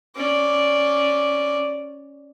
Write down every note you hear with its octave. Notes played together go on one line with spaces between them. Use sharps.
C#4 D5